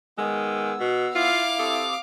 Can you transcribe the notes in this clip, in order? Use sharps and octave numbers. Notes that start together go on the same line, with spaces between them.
D#3 G#3 B3 E6
B2
E4 F4 F5 D6
C4 G4 A4 D#6